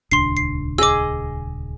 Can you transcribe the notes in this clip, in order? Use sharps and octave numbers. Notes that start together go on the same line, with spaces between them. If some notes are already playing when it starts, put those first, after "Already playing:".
D#1 C#2 D4 C6 C7
C7
G#4 D#5 D6 E6